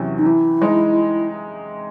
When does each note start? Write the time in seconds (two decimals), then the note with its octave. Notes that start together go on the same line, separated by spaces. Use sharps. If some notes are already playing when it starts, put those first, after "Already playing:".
Already playing: E2 C3 F#3 C#4 E4
0.18 D#4
0.26 E3 E4
0.62 G#3 D#4